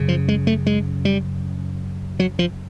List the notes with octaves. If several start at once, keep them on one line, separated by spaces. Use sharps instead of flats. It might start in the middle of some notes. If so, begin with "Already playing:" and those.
Already playing: F#2 C#3
F3
G#3
A3
G#3
G3
F#3
F3